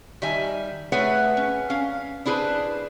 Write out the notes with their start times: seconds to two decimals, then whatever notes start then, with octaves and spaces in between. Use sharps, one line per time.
0.22 D#3 G3 E5 G#5
0.92 A3 G#4 B4 C#5 E5 F#5
1.37 C#4
1.70 C#4 F5
2.25 D4 E4 G#4 B4 C5